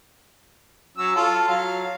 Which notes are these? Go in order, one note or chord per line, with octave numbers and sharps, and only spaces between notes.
F#3 C#4 E6
F4 A4
F#3 F5